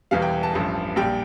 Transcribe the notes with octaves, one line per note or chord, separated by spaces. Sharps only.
E1 E2 E3 G3 F5
G5
A5
A1 G2 F3
A#1 A#2 G3 G5